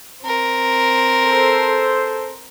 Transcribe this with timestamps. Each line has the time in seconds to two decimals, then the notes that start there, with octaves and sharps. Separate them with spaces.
0.22 C4 A#4
1.25 A4 C5